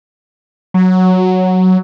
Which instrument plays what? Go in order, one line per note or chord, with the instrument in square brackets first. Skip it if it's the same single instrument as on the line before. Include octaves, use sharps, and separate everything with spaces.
[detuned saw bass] F#3